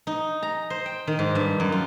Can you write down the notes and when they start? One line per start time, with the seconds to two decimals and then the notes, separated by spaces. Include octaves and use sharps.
0.07 D#4
0.43 A#5
0.70 C5
0.86 G5
1.07 D#3
1.19 G#2
1.35 G2
1.60 F#2
1.72 F4